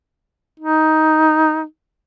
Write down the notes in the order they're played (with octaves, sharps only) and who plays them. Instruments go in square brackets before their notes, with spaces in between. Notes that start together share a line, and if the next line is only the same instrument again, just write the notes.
[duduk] D#4